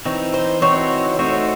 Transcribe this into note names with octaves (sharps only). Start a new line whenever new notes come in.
E3 C4 D#4 C#5
C5
E3 C4 D#4 F#4 C5 C#5
A3 D#4 F#4 C5 C#5